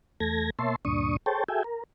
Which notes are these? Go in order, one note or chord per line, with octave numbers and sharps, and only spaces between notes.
E2 A3 A4 G#6 A#6
B2 A#3 C#5 E5 A5 C6
D2 G2 A#2 D4 C#6 D#6
G#4 A4 C5 C#5 G5 A5
F#4 G#4 A4 E5 G5 G#5
A#4